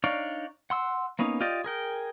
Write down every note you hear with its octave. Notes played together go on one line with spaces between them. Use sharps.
D4 D#4 C#5 D5 F5
F#5 C6 E6
A#3 B3 C#4 D#4
F4 G4 D5 D#5
G#4 A#4 G5